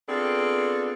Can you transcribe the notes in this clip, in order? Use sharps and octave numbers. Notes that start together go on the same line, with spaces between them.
B3 C4 D4 F4 G#4 A4